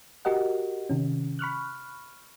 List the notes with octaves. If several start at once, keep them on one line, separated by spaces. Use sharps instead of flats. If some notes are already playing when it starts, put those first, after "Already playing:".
F#4 G4 A#4 D#5 F#5
C3 D#3 C#4
B5 C#6 F6 F#6